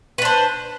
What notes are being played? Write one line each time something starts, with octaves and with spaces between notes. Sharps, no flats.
D4 B4 C5